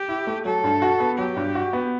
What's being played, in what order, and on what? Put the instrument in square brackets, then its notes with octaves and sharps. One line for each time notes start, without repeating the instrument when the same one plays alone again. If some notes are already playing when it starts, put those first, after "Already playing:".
Already playing: [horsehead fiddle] G4
[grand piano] E4
A3
[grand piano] F#3 [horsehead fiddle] A4
[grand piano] G2
F#4
B3
[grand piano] F#3 [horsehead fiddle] G4
[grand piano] G2
F#4
B3